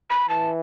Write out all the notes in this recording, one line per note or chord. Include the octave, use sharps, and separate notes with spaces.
B5
E3 A5